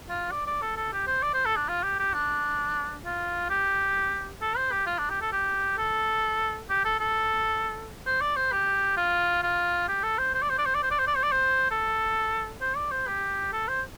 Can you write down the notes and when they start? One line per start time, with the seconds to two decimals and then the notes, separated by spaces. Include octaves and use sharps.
0.09 F4
0.31 D5
0.46 D5
0.62 A4
0.76 A4
0.92 G4
1.07 C5
1.22 D5
1.34 C5
1.45 A4
1.56 D4
1.68 F4
1.83 G4
1.99 G4
2.13 D4
3.05 F4
3.50 G4
4.42 A4
4.57 C5
4.72 G4
4.86 F4
4.98 D4
5.10 G4
5.21 A4
5.32 G4
5.78 A4
6.69 G4
6.84 A4
6.99 A4
8.06 C5
8.21 D5
8.36 C5
8.52 G4
8.97 F4
9.43 F4
9.88 G4
10.03 A4
10.18 C5
10.34 C5
10.42 D5
10.50 C5
10.58 D5
10.66 C5
10.75 D5
10.83 C5
10.91 D5
10.99 C5
11.07 D5
11.15 C5
11.23 D5
11.32 C5
11.71 A4
12.61 C5
12.76 D5
12.91 C5
13.07 G4
13.53 A4
13.68 C5